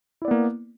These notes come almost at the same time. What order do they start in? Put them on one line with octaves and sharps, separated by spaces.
E4 D5 B3 A#3